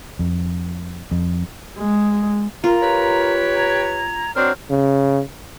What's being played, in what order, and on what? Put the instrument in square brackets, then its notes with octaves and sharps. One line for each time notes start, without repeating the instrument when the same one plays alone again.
[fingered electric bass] F2
F2
[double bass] G#3
[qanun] F4 [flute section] A#4 A#5
[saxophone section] G4 B4 C#5
[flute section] A#5 G#6
[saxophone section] C4 D4 A#4 [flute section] F#4 C5 C#5
[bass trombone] C#3